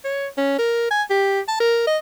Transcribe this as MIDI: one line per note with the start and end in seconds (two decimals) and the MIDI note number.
0.04 0.27 73
0.37 0.57 61
0.59 0.88 70
0.91 1.03 80
1.10 1.40 67
1.48 1.57 81
1.60 1.86 70
1.87 1.98 75